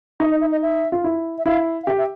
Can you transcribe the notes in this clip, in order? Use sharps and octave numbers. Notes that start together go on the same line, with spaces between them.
D#4 E5
D#5
E5
D#5
E5
F4
E4
E5
E4 F5
F5
G4 E5
E5